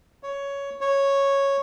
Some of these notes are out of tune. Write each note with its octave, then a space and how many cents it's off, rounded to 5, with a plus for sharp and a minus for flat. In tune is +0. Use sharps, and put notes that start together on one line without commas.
C#5 +10
C#5 -5